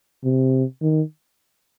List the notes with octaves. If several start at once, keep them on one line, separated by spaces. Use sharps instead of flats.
C3
D#3